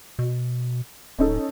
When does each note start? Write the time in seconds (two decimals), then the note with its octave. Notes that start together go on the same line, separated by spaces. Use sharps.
0.19 B2
1.19 D1 C#4 D#4 A4